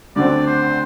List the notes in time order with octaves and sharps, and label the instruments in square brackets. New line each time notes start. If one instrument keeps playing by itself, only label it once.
[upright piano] D2 D3 A3 C4 [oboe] D5
[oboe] C5